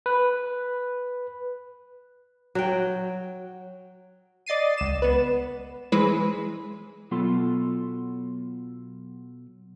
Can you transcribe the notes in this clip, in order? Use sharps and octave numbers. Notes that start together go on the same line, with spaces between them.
B4
F#3 G5
D5 D#5 A6 C7 D#7
C#2 E7
B3 B4
E3 G#3 E4 B4 C5
B2 F#3 B3 F4 A4 C6